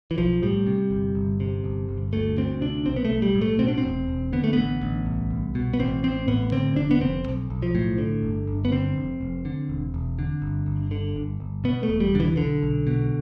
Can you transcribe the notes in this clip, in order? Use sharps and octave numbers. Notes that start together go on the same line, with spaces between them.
E3
B1 F3
A2 G3
C3
G1
G1
C3
G1
G1
D2 A3
D2 C4
C3 D4
B1 C4
B3
A3
B1
G3
A2
A3
B2 C4
D4
C4
E1
E1
D3 B3
A3
A1 B3
A1
C2
C2
B2
B3
A1 C4
A1 C4
A2 B3
D3 C4
F1 D4
B3
F1 C4
B1
B1
F3
A2
D3
G1
G1
B3
D3 C4
F1
F1
D3
E1
E1
D3
G1
G1
D3
G1
G1
B2 B3
A3
E1
G3
E1 D3
E3
B1 D3
B1
B2